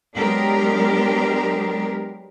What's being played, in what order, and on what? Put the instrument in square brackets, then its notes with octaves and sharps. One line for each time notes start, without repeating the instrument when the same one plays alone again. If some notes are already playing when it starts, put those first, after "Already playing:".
[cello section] F#3 G#3 B3 D4 G4 A#4